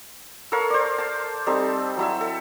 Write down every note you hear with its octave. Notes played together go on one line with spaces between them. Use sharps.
A4 A#4 C#5 F5
C5 D5
A5
G3 C4 D#4 A4
F#3 E4 E5
A4